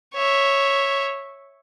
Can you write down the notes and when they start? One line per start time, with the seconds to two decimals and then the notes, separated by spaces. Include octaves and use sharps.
0.14 C#5 E5